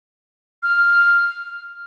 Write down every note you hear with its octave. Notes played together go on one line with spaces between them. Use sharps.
F6